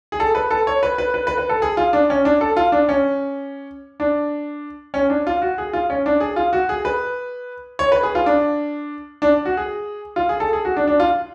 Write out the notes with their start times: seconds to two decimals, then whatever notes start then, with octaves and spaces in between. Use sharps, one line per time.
0.12 G#4
0.20 A4
0.35 B4
0.51 A4
0.67 C#5
0.83 B4
0.98 B4
1.14 B4
1.27 B4
1.38 B4
1.49 A4
1.62 G#4
1.77 F4
1.93 D4
2.10 C#4
2.25 D4
2.41 A4
2.57 F4
2.72 D4
2.89 C#4
4.00 D4
4.94 C#4
5.10 D4
5.27 F4
5.42 F#4
5.58 G#4
5.73 F4
5.90 C#4
6.06 D4
6.20 G#4
6.36 F4
6.53 F#4
6.69 G#4
6.85 B4
7.79 C#5
7.92 B4
8.03 G#4
8.15 F4
8.26 D4
9.22 D4
9.45 F#4
9.57 G#4
10.16 F4
10.29 G#4
10.40 A4
10.53 G#4
10.65 F#4
10.77 D4
10.87 D4
11.00 F4